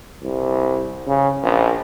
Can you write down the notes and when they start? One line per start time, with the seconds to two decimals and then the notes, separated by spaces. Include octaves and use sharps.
0.23 C2
1.07 C#3
1.43 A#1